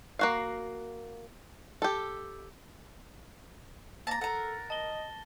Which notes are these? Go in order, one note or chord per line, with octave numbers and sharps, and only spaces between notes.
A#3 F#4 F5
G4 A4
A#3 A5 A#5 A6 A#6
A4 A#4 F#5
D#5 A5 G7